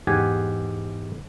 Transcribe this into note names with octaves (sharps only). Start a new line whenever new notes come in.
E2 G#2 G4 F#5 G#5